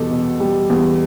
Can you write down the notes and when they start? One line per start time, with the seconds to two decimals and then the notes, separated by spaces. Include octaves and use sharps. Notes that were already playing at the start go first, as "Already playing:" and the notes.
Already playing: E2 B2 G3 G4 A4
0.11 B2
0.40 G3
0.70 E2